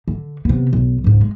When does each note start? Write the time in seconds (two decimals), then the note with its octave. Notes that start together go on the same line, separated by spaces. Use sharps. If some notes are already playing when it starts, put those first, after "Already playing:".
0.08 D3
0.45 C3 B3
0.73 B1
1.04 C#2 G#2
1.21 G#3